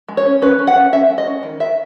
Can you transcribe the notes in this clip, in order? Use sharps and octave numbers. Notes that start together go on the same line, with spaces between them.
G#3
C#5
C#4
C#4 B4
C#4
F#5
C#4
C#4 E5
G#3
D#5
C#4
D#3
D#3 E5